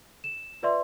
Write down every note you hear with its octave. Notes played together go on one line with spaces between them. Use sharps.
E7
F4 B4 D5 E5 C6